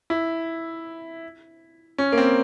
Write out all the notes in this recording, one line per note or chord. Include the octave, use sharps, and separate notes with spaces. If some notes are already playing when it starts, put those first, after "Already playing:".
E4
C#4
A#3
C4